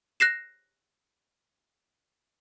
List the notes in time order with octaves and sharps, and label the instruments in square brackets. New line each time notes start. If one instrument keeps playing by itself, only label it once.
[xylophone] F#6 A#6 C7 E7